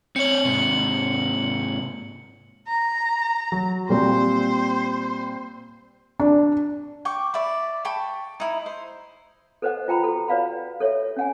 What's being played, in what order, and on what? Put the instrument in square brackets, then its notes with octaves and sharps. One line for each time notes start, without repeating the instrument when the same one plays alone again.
[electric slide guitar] C4 C#5 [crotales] C#7 F#7
[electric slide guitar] G#2 C3
[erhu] A#5
[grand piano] F#3
[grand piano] A#2 G3 C4 [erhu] C5
[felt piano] D4
[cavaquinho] G5 C#6 D6
D5 E5 B5
G5 A5 B5 C#6
D#4 E4
C5
[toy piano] A4 B4 C5 D#5 F#5
F4 G5 A#5 B5
F#4 A4
B4 D5 F5 F#5 B5
A4 C#5 E5
C#4 F#5 G#5